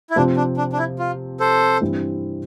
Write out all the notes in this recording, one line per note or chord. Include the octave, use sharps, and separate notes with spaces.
E4
C3 F3 C4 D4 F4
D4
D4
D4
E4
F4
A4 C5
G2 E3 G3 C4 E4